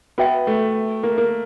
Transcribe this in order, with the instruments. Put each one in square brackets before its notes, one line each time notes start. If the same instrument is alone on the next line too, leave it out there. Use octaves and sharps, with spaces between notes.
[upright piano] B3 [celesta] F#4 B4 E5 G5
[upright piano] A3
A#3
A#3